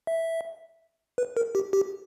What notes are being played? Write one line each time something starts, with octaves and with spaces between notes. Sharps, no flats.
E5
B4
A#4
G4
G4